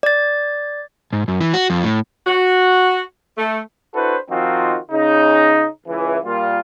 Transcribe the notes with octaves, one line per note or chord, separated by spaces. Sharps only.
D5 A6
G#2
F#2
E3
F#4
F2
A2
F#4
A3
D4 E4 F#4 A4 B4 C5
D#3 F3 C4 D#4 F4 F#4
C#3 D#4
C#2 E3
A#2 G3 F4